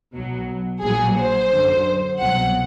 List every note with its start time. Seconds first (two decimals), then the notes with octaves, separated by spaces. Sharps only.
0.14 B1 B2 F#3
0.83 A#1 A#2 F#3 G#4
1.18 C5
1.51 F#2 D3 F#3
2.20 C2 B2 F#3 F#5